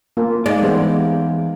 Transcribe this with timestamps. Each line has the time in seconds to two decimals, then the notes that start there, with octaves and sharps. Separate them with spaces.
0.17 A#3 F4
0.46 G#3 D#4 D5 F5
0.63 E2 G3 B3 C5